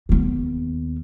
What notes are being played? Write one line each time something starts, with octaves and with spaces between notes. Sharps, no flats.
D#2 B3